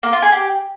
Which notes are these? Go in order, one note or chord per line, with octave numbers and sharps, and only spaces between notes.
A#3
F4
G#4
G4